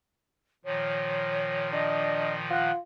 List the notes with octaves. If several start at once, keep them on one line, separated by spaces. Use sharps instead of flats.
A#2 D#3 F3 C#5
D4 D#5
F4 F#5